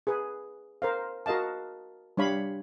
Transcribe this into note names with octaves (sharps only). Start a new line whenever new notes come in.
G#4 B4
A#4 C5 F5
F#4 A#4 D#5 F5 A5
G3 D4 C#5 F5 B5